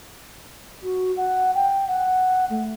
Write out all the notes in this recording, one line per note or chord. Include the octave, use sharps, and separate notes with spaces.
F#4
F#5
G5
F#5
A3